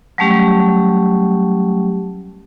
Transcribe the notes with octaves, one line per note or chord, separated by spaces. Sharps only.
F#3 G3 A3 C#4 G4